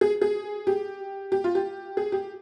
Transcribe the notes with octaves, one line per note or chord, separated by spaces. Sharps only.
G#4
G#4
G4
G4
F4
G4
G#4
G4